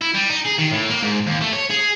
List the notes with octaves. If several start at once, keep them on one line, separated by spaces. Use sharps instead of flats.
E4
G3
D#4
G#4
D#3
A2
A#3
G#2
D#2
A3
C#5
G#4